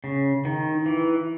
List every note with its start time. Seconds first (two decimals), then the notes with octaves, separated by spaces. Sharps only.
0.04 C#3
0.45 D#3
0.86 E3